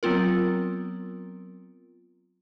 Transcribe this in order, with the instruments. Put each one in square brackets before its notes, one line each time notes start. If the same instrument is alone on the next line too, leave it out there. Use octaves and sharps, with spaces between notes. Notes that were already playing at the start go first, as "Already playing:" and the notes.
[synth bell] F#3 B3 C4 F4 A#4